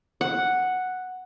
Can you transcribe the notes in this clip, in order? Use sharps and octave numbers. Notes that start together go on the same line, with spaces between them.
F#5